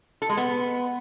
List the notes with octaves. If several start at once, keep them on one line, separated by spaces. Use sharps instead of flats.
A4
G#3
B3